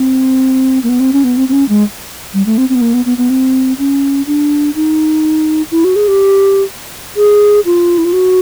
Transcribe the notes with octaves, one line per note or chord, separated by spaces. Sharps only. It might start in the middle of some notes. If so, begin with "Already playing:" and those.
Already playing: C4
A#3
B3
C4
C#4
B3
C4
C4
C#4
G#3
G3
A3
C4
C4
B3
A#3
B3
B3
B3
C4
C#4
D4
D#4
E4
F#4
G#4
G4
G#4
F4
E4
F4
F#4